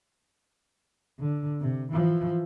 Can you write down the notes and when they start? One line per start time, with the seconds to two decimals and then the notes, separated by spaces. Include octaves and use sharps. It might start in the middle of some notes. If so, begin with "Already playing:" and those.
1.20 D3
1.60 C3
1.93 E3 F3